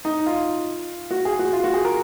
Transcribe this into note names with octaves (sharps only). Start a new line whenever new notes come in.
D#4
F4
F#4
G#4
F#4
F4
F#4
G#4
A#4